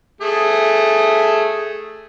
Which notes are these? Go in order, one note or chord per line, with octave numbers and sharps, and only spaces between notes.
A3 G#4